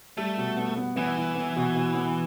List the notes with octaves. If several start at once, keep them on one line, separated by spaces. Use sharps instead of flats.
G3 A3
B2
B3
B3
E3 B3
E4
B3
B2
B2
B3